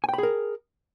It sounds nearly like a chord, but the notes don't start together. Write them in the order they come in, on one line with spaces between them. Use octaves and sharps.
G#5 G5 B5 G#4 A#4